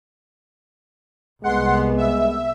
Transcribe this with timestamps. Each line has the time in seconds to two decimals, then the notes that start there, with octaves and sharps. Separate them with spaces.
1.44 C2 G#3 B3 F#5 C6
1.97 E5